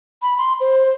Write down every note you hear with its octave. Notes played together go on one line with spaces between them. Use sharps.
B5
C6
C5